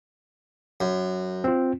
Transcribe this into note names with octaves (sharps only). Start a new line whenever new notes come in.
F#2
C4 F4